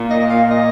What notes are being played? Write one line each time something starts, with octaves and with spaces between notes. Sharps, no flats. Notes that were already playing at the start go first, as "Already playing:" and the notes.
Already playing: A#2
D#5
F5
D#5